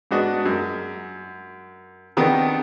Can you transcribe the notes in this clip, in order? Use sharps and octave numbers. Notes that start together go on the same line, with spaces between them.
G#2 B3 D4 F#4 D#5
F#2
C3 D#3 B3 D4 D#4 D#6